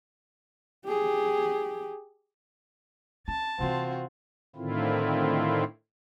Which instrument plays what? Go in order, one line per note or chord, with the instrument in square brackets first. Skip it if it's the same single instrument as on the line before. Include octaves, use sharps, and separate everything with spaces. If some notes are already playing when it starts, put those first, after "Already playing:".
[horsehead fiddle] G4 G#4
[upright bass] C#4 [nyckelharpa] A5
[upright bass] C3 E3 [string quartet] C4 F4 F#4
[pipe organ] A2 D3 D#3 C4 E4 F4